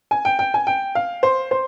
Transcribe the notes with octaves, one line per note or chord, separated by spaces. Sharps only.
G#5
G5
G5
G#5
G5
F5
C5
C5